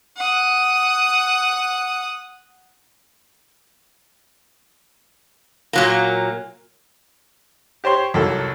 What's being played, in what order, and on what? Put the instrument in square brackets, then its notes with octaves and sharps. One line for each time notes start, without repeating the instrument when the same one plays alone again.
[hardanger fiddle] F#5 D#6
[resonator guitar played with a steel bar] A#2 F#3 A#3
[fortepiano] G4 C5 C#5 C6 C#6
C2 F2 G#2 F#3 A#3 A4